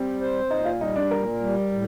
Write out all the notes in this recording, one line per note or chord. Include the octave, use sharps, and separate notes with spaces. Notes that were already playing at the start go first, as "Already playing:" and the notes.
Already playing: G3 C4
C5
A#2 D#4
F4
G3 D#4
D4
A#2 A#4
G3
A2